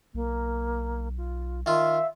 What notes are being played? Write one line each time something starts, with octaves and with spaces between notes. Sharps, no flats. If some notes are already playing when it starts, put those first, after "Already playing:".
B1 A#3
F4
D#3 F4 E5 F5